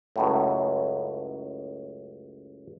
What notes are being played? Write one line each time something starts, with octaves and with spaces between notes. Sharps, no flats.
C#2 F#2 A2